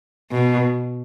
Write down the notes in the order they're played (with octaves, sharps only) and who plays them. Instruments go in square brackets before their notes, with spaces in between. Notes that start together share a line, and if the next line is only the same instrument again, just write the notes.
[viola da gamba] B2